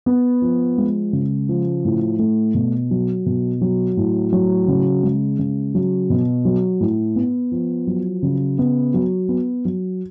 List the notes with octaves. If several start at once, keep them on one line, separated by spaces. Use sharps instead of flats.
B3
F3
G#3
C#3
F3
A2
A3
B2
F#3
B2
F#3
A2
F#3
C#3
G#3
C#3
F#3
B2
F#3
A2
B3
F3
F#3
C#3
B3
F#3
B3
F#3